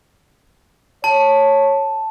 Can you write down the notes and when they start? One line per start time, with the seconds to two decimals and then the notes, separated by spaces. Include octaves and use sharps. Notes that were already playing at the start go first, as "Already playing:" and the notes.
1.04 C#5 A5